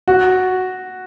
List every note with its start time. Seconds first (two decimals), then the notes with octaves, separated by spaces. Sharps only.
0.08 F#4